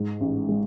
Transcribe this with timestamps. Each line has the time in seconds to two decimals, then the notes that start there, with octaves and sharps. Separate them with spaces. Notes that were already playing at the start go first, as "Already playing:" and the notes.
Already playing: G#2
0.20 A1
0.49 G#3